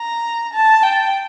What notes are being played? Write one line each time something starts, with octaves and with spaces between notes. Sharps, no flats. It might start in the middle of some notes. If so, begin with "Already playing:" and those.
Already playing: A#5
A5
G5